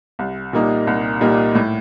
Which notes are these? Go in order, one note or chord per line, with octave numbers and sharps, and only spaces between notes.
C2
A#2 G3 A#3 D#4
C2
A#2 G3 A#3 D#4
A2